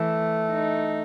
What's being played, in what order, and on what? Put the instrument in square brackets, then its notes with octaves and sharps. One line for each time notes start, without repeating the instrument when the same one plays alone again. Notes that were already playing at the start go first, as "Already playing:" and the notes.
Already playing: [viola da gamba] E3 [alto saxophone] A3
[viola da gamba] D#4